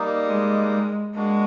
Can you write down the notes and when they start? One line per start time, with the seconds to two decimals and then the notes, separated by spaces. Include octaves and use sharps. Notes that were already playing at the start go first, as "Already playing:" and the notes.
Already playing: G3 A#3 D#4
0.26 G#3
1.14 G#3 A#3 D4 F#4